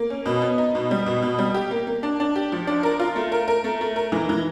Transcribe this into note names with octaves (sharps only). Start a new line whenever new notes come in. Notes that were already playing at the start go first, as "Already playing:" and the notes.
Already playing: A#3
C#4
B2
B3
D#4
B2
G3
B2
B2
G3
G4
A#3
A#3
D4
D4
G4
F3
D4
A#4
F4
A3
A#4
A#4
A3
A3
A#4
E3
E3